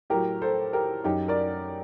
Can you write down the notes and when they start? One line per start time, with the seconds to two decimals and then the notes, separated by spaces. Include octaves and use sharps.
0.10 A2 F#3 G4 A#4
0.42 A4 C5
0.73 G4 A#4
1.04 F#2 F#3 D#4 G4
1.28 A#4 D5